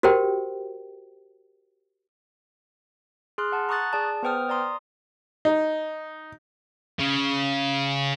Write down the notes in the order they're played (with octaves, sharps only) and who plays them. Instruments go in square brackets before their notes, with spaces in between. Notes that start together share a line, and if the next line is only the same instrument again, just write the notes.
[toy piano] F#4 G4 A#4 C5 G5
[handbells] G#4 C6 F6 F#6
F#5 A5
A#5 C#6 D#6 F#6 A6
G#4 D5 A5
B3 B4 C5 G5 D#6 F6
D5 A#5 C6 D#6
[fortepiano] D#4
[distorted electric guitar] C#3